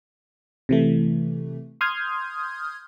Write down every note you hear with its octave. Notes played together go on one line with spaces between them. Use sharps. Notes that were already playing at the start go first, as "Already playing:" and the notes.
C3 E3 A3
C6 D#6 F6 G6 G#6